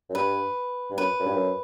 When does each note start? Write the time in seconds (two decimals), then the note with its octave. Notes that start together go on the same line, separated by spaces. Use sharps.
0.09 F#2
0.15 G2 B4
0.91 G2
0.98 F#2 B4
1.19 F#2
1.26 G2
1.34 F#2